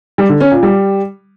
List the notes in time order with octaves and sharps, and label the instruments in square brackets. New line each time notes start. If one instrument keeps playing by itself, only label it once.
[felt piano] G3
D3
C#4
A#2
G3